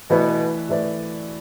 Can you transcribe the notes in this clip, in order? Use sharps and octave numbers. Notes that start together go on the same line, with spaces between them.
B2 E3 A3 E4 B4 D5
E3 A3 E4 B4 D5